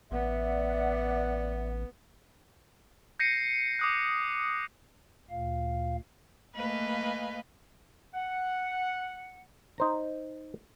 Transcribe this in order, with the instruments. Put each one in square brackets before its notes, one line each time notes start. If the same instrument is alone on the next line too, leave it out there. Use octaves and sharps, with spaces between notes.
[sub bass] A1 [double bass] B3 [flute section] D5 E5 F#5
[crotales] G6 A#6 C7 C#7 D#7
D6 D#6 F#6
[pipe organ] D2 A#2 F5
[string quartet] A3 A#3 B4 D#5 F5 G#5
[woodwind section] F#5
[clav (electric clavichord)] D#4 C5 A#5